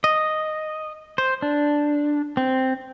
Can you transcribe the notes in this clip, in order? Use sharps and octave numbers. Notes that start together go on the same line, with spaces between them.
D#5
C5
D4
C4